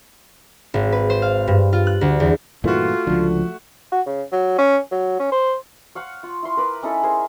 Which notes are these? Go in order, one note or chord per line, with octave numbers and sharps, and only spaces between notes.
G#1
B4
C5
F5
G2
F4
F#6
D2
E2
G2 A#2 E3 A3 F4 F#4
C#2 D3 F3
F#4
C#3
F#3
C#4
F#3
C#4
C5
C#5 F5 F#5 C#6
F4
E4 C6
A#4 B4 D6
C#4 D#4 E4 A4
G#4 A#4 C5 G#5